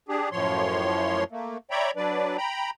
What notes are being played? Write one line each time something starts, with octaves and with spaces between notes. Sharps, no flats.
D4 G4 G#4
F#2 A2 F3 C#5 C6
A3 A#3
C#5 D5 E5 G5 A#5 B5
F#3 D4 B4 D5
G5 A#5 B5